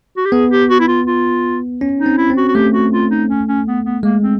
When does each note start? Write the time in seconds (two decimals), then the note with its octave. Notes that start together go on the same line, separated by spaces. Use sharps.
0.17 F#4
0.25 G4
0.32 B3 G#4
0.52 G4
0.70 F#4
0.80 E4
0.88 F4
1.07 F4
1.81 C#4
2.00 D#4
2.06 C4
2.18 E4
2.30 C4
2.37 F#4
2.48 F#4
2.55 A3 G4
2.74 F#4
2.93 F4
3.11 D#4
3.30 C#4
3.48 C#4
3.67 B3
3.85 B3
4.03 G#3 A#3
4.23 C4